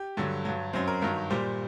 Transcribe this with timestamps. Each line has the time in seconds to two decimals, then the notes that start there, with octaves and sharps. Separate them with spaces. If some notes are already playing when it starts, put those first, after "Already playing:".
Already playing: G4
0.17 G2 D3 F#3
0.45 G2 F#3
0.73 F#2 F#3 C4
0.88 A#4
1.02 G2 D#3 F#3 A#4
1.30 A#2 G3 C5